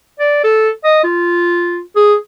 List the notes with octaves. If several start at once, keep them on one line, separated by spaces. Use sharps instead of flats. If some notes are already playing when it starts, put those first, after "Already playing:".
D5
A4
D#5
F4
G#4